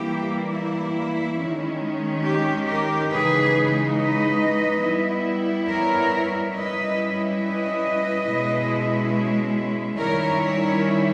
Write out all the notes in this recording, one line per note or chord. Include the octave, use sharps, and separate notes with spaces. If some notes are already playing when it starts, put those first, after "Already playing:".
Already playing: E3 G3 A#3 E4 G4
E4
D#3 G#3 C#4
G4
G4 A#4
C#3 E3 G#3 D#4 G#4 B4
B4 D#5
G3 B3 E4
A#4 C#5
G3 C#4 E4 B4 D#5
B4 D#5
B2 G#3 C#4 E4
D#3 G3 C#4 E4 A#4 C#5
A#4 C#5